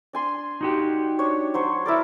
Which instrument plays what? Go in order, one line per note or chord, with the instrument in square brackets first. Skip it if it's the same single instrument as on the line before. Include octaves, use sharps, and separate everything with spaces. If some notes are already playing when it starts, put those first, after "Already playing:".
[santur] D4 G#5 C6
[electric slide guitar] D#4 F#4 G4
[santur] D4 C#5
F#3 C5 C#5
E4 A#4 D5